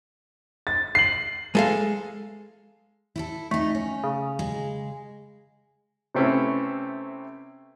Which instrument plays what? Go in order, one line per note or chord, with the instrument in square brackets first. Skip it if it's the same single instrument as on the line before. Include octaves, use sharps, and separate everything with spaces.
[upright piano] A6
C7 F#7
[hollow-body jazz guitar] G#3 A4 F5
[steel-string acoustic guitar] E4 F#4 A4
[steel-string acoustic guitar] F2 D#4 [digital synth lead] A3
[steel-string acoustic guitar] C#4
[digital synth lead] C#3
[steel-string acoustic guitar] G#3
[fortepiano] C3 A3 C4 C#4 E4 B4